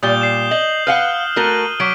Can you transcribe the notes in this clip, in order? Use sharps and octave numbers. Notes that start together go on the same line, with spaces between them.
A#2 G3 D#6 G6 G7
C7 E7
D#5 F#7
B4 F5 F#5 F6 F#6
A3 F#4 A#4 D#7 F#7 G7
F#3 D6 B6 D7